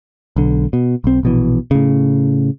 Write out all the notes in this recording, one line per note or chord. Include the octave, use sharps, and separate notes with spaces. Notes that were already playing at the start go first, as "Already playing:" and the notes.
B1 D3
B2
B1 C4
A#1 B2 E3
A2 C#3